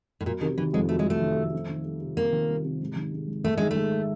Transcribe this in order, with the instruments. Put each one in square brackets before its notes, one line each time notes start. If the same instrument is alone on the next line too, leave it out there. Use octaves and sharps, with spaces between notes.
[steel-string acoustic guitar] A2
[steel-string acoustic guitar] A#2 [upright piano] F#3
[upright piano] C3 [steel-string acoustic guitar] D#3
[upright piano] D#3 [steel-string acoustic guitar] E3
[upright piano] F2 [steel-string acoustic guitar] G#3
[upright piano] F#3 [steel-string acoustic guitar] A3
[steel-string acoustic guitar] G#3
[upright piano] C3
[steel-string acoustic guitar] A3
[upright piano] D#3
F2
C4
D#3
G3
C3
[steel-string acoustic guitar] A#3 [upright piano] C4
[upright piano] D#3
G3
C3
G#2
D#3
G#3
G#2
[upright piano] G#2 [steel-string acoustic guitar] A3
[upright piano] D#3 [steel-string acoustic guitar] G#3
[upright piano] G#3 [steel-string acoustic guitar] A3